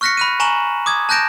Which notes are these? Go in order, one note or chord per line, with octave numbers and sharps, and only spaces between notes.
C#6 F6 F#6 A#6 B6 C#7
B5 F#6 D#7
G#5 A#5 C#6 E7 F#7
D6 D#6 G#6
A5 F#6 G6 A#6 D7 E7